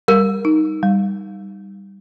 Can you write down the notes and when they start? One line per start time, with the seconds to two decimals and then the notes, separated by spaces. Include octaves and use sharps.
0.08 G3 A#4
0.45 D#4
0.83 G3